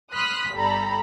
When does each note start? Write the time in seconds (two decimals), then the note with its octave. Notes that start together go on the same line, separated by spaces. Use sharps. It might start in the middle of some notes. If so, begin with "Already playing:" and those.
0.14 B5 C6 D#6 F6 F#6 B6
0.53 G1 G3 A4 A#5 B5